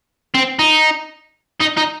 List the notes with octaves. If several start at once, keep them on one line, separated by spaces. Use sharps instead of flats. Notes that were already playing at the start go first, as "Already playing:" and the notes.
C4
D#4
D#4
D#4